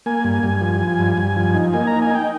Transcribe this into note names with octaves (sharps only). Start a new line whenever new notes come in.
A#3 G#5
G2
G2
F3
F3
G2
G2
F3
D#4
A#3 G#5
D#4 A#5
G#5
D#4 G5